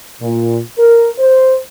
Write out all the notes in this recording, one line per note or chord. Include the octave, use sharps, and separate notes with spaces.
A#2
A#4
C5